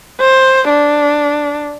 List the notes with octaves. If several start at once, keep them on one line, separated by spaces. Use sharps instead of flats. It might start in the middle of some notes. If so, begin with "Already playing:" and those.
C5
D4